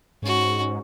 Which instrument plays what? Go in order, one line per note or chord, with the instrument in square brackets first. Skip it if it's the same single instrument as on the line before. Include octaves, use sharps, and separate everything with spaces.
[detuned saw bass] G#2 [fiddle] C#4 F#4